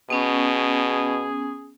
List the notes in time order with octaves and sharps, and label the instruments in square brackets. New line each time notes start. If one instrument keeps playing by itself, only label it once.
[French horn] B2 [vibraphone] B3 C#4 [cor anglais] G#4